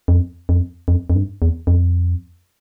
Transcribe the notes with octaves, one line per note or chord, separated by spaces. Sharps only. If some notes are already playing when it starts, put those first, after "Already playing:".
F2
F2
F2
F2
G2
E2
F2